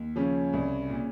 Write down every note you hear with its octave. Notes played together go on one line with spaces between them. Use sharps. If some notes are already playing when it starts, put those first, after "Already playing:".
Already playing: D#2
C#3 F3 C#4
C2
A#2